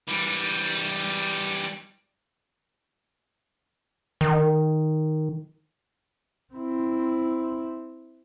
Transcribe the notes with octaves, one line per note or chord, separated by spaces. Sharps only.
E3 G3
D#3
C4 E4